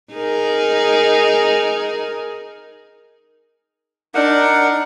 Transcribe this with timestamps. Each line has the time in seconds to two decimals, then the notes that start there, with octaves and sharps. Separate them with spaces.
0.13 D#4 G#4 A#4
4.15 D4 D#4 A#4 F#5